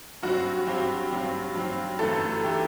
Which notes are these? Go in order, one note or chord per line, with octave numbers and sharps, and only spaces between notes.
G2 F#3 C4 F#4
G2 F#3 C4 G4
G2 F#3 C4
G2 F#3 C4
G1 F#2 E3 A3 A4
E3 A3 G4